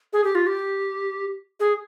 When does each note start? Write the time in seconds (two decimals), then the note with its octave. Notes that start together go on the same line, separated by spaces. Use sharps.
0.13 G#4
0.24 G4
0.35 F4
0.47 G4
1.60 G#4